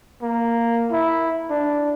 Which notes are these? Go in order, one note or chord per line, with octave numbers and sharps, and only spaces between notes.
A#3
E4
D4